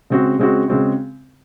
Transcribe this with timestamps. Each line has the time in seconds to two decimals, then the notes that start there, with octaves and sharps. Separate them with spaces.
0.10 C#3 G#3 C4 F#4
0.39 C#3 G#3 C4 F#4
0.68 C#3 G#3 C4 F#4